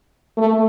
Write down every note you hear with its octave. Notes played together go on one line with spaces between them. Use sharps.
A3